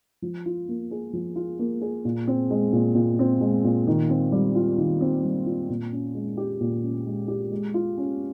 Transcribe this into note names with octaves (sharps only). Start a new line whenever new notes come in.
F3
F4
A#3
G#4
F3
F4
A#3
G#4
A#2
C4
G#3
A#2
A#2
C4
G#3
A#2
D#3
C4
G3
F4
D#3
C4
G3
F4
A#2
C#4
G#3
G4
A#2
C#4
G#3
G4
G#3
F4
C#4